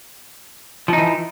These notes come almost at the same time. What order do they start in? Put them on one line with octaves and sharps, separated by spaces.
F3 D#4 E3